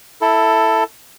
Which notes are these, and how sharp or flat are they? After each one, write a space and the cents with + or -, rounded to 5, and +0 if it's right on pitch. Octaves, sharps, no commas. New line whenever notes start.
E4 +0 A4 +10